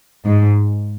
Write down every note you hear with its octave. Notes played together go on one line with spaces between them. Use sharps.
G#2